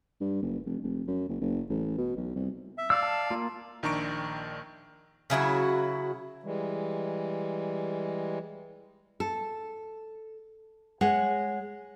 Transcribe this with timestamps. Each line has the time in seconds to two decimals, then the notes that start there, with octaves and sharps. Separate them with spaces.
0.21 G2
0.43 F#1
0.66 F1
0.83 F1
1.08 F#2
1.29 F#1
1.41 F#1
1.70 A1
1.98 B2
2.17 B1
2.36 C2
2.78 E5
2.90 D5 F5 E6
3.03 A5
3.30 A#3 F4
3.83 A#1 D#3 D4 A#5 C#6 D7
5.30 C#3 F#3 E4 F#4
6.43 E3 G3 G#3
9.20 A4
11.01 G#3 C#5 F#5